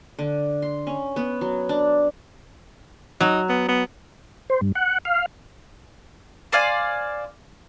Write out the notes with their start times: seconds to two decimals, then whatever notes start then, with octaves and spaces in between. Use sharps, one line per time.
0.19 D3
0.62 C6
0.87 C#4
1.16 B3
1.41 F#3
1.69 D4
3.21 F#3 D#4
3.49 B3
3.69 B3
4.50 C5
4.61 G2
4.75 F#5
5.05 F5
6.53 C5 D5 F5 G#5